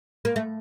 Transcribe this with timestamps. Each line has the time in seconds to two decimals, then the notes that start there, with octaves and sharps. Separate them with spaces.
0.25 A#3
0.36 A3